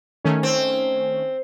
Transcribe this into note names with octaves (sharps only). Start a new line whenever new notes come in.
D#3 A3 C#4
C4